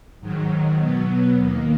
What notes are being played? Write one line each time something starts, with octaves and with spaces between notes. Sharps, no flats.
G#2 D#3 F#3
B2 F#3 B3
D#2 D#3 A#3